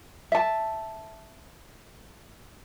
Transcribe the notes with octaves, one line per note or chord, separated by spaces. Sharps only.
E5 A5